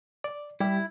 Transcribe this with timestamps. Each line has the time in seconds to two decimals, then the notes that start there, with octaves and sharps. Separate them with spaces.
0.24 D5
0.60 G3 E4 G4